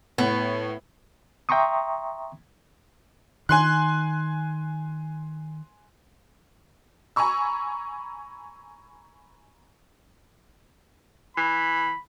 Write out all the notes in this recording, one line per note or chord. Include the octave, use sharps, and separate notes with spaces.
A2 B3
E5 G5 A#5 C6 C#6 D#6
D#3 G#5 C6 F#6
G#5 A#5 B5 C#6 E6
E3 B5